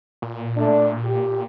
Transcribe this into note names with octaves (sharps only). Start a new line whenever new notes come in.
A#2
A3 D4
G4